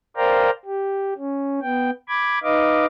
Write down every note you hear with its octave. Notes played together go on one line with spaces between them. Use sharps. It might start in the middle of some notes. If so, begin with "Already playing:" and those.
A#4 C5 D5 F5 G5 A#5
G4
C#4
B3 G5
B5 D6 G#6
D#4 B4 D#5 F5 D6